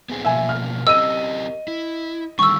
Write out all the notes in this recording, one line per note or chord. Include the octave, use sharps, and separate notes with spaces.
B3 C4 G#4
B2 F3 A#3 E5 G#5
F6
C4 G4 A#4 D#5 E6 D#7
E4
D3 D#3 G3 C#6 E6